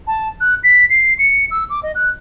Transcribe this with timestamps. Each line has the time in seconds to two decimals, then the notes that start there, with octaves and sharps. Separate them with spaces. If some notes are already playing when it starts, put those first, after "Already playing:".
0.07 A5
0.41 F#6
0.64 B6
0.90 C7
1.19 C#7
1.51 E6
1.70 D6
1.83 D#5
1.95 F#6